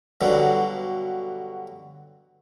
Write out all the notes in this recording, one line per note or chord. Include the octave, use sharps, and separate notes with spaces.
G2 B2 D3 F#3